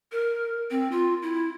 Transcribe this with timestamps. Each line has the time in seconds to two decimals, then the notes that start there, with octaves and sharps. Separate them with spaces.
0.12 A#4
0.71 C4
0.92 F4
1.22 E4